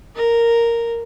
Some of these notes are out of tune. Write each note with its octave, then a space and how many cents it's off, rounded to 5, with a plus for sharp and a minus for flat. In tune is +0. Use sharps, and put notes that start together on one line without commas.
A#4 -5